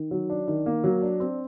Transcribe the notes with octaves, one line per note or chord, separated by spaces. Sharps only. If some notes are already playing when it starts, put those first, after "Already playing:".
Already playing: D#3
F#3
D4
D#3
A#3
F#3
D4
C4